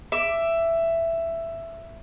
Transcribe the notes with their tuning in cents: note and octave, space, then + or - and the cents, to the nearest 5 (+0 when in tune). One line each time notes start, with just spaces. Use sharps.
E5 +10 D6 +0